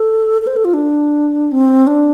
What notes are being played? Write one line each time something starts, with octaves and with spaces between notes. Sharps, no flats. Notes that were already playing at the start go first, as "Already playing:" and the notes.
Already playing: A4
A4
C5
A4
F4
D4
C4
D4